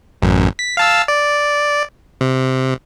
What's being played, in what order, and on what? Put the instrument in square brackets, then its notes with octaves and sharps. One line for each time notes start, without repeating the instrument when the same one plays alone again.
[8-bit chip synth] A1 F#2
B6
F5 A5 E6
D5
C3